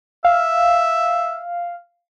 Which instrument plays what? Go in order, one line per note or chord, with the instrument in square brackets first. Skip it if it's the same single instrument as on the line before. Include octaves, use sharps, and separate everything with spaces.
[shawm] E5 [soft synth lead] F5